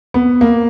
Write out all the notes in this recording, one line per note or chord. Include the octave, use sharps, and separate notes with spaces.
B3
A#3